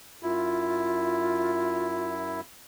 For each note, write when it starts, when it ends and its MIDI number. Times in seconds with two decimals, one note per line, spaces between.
0.23 2.41 42
0.23 2.41 64
0.23 2.11 65